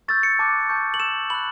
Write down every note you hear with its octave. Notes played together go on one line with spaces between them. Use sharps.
C#6 E6 G6 A6
C#7
A5 D6 F#6
A5 C#6 G6
F#7
C#6 E6 G6 E7
B5 F#6 F#7